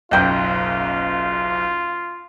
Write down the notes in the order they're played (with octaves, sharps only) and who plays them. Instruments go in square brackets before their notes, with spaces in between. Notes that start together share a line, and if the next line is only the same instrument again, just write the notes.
[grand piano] F#1 B1 [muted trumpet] F4 [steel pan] D#5 G5